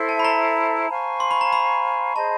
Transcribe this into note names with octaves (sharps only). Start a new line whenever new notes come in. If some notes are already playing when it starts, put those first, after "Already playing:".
Already playing: E4 A4 C5 E5
A5
B5
A#5
C5 F5 G#5 C#6
C6
B5
A#5
B5
G#4 C5 D#5 A5